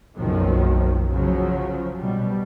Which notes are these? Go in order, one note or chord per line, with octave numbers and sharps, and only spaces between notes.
F#1 B1 D#3 F3 F#3
C#3 F3 F#3
B2 G3